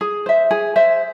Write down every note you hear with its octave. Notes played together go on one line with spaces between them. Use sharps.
G#4
C5 E5
G#4
C5 E5